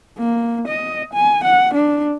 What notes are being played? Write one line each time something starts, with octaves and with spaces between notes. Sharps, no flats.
A#3
D#5
G#5
F#5
D4